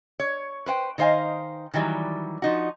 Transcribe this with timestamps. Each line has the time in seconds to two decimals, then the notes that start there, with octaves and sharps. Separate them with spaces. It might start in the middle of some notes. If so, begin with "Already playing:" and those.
0.20 C#5
0.66 B4 C5 F#5 G5
0.98 D#3 D#4 C5 F5 G#5
1.74 D#3 E3 F#3 G3
2.42 F3 D#4 F#4